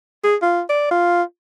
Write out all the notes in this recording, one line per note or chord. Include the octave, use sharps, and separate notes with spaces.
G#4
F4
D5
F4